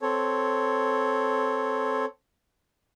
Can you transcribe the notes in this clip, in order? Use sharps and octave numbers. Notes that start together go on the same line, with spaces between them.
C4 A4 C#5